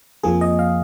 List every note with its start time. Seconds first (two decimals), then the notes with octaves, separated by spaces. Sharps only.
0.23 F2 F3 A#3 G#4
0.41 D#5
0.59 F5